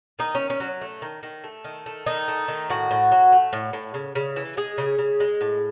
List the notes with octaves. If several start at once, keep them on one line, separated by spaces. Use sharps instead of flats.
D#3 D#4
D#3 C#4
C#4
F#3
A3
D#3
D#3
A3
D#3
A3
D#3 D#4
A3
D#3
A2 F#4
A2
F#3
A3
A2
A2
C#3
C#3
E3
G#3 G#4
C#3
C#3
G#3
A2